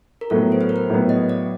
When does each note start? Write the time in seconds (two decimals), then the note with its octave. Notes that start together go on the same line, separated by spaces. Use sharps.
0.21 A#4
0.30 A2 F#3 B3 A4
0.52 C5
0.61 B4
0.69 A#4
0.76 B4
0.90 A2 F#3 B3
1.09 D#5
1.29 D5